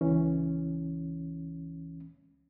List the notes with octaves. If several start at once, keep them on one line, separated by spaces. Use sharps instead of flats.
C#2 E3 C#4